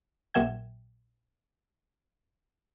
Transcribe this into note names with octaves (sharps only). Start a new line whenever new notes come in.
A#1 A#2 F#3 E5 G5 G#6